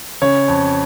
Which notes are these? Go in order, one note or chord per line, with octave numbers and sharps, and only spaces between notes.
C#3 C#5
F2